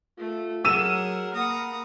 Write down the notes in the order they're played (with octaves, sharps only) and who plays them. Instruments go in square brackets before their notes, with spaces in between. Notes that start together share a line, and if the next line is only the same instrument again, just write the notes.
[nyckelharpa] A3 [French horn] F4
[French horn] F#3 [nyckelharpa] G#4 [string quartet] A#4 F#5 [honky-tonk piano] E6 D#7 E7
[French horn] A#3 [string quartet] F5 F#5 B5 [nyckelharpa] A#5 D#6